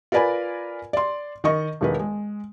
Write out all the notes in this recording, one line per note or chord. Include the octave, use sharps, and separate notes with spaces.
F4 A#4 B4 D5 G#5 B5
D5 C6
D#3 D#5 C#6
E1 D#3 B4
G#3